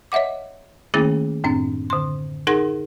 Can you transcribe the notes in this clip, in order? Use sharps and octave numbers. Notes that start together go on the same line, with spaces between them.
C#5 D#5 E5 F#5 D6
D#3 A3 A#3 C#4 E4 G#4
F#2 A2 C4 D4
D3 C6
D#4 G#4 A#4 F#5 C6 A#6